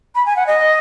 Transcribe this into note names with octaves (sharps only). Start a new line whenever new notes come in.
B5
G#5
F#5
D#5